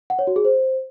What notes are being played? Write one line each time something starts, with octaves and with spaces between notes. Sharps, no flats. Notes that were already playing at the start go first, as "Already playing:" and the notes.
F#5
C#5
F#4
G#4
C5